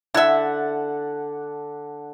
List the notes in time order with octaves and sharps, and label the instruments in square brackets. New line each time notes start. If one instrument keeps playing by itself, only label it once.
[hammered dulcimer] D3 F#5 A5 [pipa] E4 E5